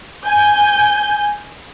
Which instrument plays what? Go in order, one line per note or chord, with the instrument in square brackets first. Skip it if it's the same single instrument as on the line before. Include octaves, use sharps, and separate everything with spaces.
[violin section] G#5 G6